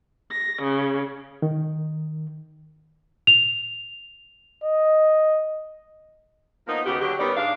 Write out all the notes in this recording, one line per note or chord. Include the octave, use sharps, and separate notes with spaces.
A#6
C#3
D#3
F7
D#5
F3 A#3 B3 D#4
D#2 C#3 B3 F#4 G4
D3 F#3 G4
G3 B3 C#4 D#4 A#4 D5
G#2 D4 F5